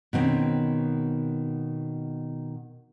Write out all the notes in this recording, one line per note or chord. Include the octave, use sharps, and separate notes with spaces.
B2 D#3 C4 C#4